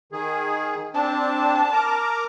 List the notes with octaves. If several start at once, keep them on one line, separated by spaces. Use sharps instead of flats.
D#3 G#4
C4 D4 A5
A#4 A#5 D6